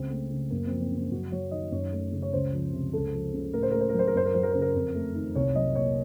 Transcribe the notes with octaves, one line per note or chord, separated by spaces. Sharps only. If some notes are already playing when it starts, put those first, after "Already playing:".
Already playing: C#2 C4
A3
C#3
F#2 A#3
F3 C4
C4
C#3
C4
F#2 F#4
F#3 C#5
D#3 D#5
F#2 C#5
A3
C#3
C#5
C#2 C5
F3
C3
C#2 A4
F3
C#3
A2 A#4
C5
A3 A#4
C5
A#4
F#3
C5
A#4
F#2 C5
A#4
F#3 C5
A#4
C#3 C5
A#4
F2
A3
D#3
C2 C#5
F#3 D#5
A#2 C#5